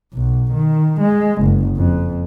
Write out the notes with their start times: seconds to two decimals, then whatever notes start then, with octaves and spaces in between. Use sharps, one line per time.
0.14 B1
0.53 D#3
1.01 G#3
1.43 F#1
1.77 F2